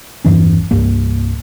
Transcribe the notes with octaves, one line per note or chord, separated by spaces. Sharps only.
E1 G2 E3 C#4
C2 G2 A#3